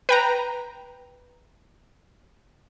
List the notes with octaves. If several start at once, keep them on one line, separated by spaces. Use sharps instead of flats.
B4 G5 A#5